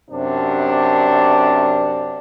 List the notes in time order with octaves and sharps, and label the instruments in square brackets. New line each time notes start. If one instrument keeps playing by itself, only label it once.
[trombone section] F#2 C3 D4